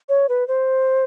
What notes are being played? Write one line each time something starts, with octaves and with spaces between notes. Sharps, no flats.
C#5
B4
C5